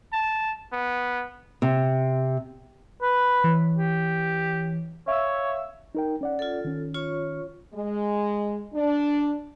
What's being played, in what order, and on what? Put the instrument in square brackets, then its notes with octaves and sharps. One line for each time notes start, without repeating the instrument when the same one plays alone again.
[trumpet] A5
B3
[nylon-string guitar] C3
[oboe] B4
[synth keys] E3 C#5
[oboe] G4
[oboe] C#5 [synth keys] E5 F5 E6
[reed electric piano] D#4 A#4 G5
C#4 D5 F#5
[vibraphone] F4 A4
[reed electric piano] D#3 C#4
[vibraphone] F4 C#5 C#6
[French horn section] G#3
D4